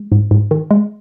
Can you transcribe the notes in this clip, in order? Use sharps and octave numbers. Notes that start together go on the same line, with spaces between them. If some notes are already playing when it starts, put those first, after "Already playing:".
Already playing: G#3
G#2
G#2
D#3
G#3